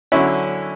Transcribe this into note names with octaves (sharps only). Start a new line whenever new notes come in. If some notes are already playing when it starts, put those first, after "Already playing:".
D3 F#3 C#4 E4